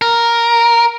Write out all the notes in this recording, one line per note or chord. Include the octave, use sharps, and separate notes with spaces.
A#4